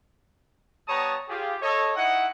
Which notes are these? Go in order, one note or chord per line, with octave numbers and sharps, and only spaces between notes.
G3 B3 C#5 A5 A#5 D#6
F4 G4 G#4
A4 C#5 D#5
D#4 E4 D#5 F#5